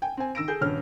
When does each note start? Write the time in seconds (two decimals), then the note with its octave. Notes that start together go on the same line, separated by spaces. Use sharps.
0.02 G5 G#5
0.17 C4 G#5
0.35 D#3 E6 A#6 D7
0.48 G#4 A4 G6
0.61 D#1 G2 C#4 F6